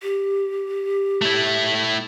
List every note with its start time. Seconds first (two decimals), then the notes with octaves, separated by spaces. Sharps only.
0.03 G4
1.22 A3 E4